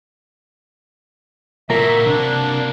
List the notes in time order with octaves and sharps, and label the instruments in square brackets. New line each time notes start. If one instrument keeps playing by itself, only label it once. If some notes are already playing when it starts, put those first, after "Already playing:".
[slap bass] A#2 [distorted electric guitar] A#3 F#4 [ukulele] A#4 [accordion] E5
[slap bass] C3 [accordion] D4